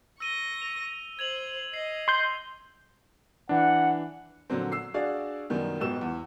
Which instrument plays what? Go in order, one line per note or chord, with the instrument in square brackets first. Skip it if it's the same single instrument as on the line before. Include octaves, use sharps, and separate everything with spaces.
[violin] C#6 A#6 [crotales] E6 D#7 G7
[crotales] F7
[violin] C5 [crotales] G#6 F7 F#7
[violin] D#5 [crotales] C7
[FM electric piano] C6 G6
[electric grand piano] E3 D4 [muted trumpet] F#5
[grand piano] A#2 D3 F3 F#3 C4
E6 C7
D4 F#4 G#4 D5 F5
F#2 B2 D#3 G3
D#1 G#2 B2 G4 E6 E7
E2